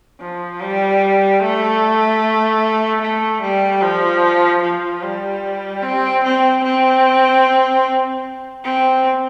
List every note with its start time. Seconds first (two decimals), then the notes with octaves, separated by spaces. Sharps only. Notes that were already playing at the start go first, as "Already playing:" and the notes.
0.21 F3
0.61 G3
1.40 A3
3.01 A3
3.42 G3
3.82 F3
4.62 F3
5.02 G3
5.83 C4
6.23 C4
6.63 C4
8.64 C4